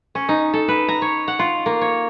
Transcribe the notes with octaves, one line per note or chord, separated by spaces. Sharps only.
C#4
D#4
A4
B4
A#5
C#5
F#5
F4
A#3
C#5